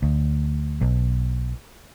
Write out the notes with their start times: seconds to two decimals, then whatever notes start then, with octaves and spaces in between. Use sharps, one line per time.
0.02 D2
0.81 B1